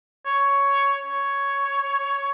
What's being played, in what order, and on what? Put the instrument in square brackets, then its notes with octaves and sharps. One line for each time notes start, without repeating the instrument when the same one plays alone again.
[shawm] C#5
C#5